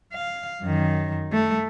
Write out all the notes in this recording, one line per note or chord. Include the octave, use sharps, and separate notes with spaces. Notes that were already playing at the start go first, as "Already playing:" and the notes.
F5
F#2 D#3
A3